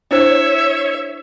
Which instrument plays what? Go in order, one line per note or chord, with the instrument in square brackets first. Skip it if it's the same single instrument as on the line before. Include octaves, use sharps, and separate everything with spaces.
[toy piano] D4 E4 C5 [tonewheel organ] C#5 [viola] E5